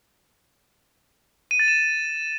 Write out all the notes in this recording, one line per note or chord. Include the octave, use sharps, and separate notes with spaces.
D#7
A6
E7